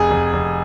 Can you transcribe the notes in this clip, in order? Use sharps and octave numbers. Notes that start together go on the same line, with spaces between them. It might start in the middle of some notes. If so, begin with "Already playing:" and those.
Already playing: F1 G#4
F1
F1